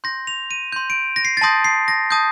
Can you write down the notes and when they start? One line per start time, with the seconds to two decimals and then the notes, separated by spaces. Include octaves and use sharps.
0.04 C6 G6 A#6
0.27 F7
0.51 D#7
0.72 C6 G6
0.90 D7
1.16 A#6
1.25 C7
1.37 A6
1.41 A5 C6 D#6 G6 A#6
1.65 C7
1.88 A#6
2.11 A5 D#6 G6